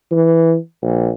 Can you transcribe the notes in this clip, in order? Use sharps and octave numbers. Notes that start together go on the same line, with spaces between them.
E3
A#1